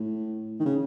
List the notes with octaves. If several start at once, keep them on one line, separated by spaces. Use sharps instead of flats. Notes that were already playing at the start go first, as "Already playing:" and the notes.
Already playing: A2
D#3
C#3